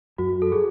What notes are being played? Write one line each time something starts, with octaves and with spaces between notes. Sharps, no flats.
F#2 F#4
A4
F#3 G#4